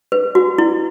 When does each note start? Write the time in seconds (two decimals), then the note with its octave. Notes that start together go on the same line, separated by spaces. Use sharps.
0.12 B4
0.35 F#4
0.58 E4